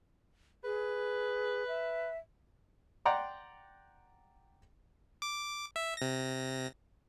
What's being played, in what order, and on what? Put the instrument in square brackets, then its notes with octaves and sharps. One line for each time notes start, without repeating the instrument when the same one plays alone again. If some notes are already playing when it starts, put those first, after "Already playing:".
[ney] G#4 [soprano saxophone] B4
[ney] E5
[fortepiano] D5 F#5 G5 A#5 C6
[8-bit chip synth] D6
E5
C3 A#6